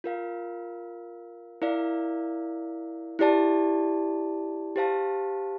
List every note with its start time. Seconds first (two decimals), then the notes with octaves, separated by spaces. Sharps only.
0.04 F4 A#4 F5
1.62 E4 A#4 D5 F5
3.19 E4 G4 D5 A5
4.76 G4 C5 F5 A5